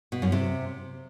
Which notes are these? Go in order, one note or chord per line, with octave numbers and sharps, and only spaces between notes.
B2
F#2
C3